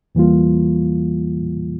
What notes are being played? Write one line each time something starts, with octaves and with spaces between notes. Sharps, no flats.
E2 E3 G3 A#3 F4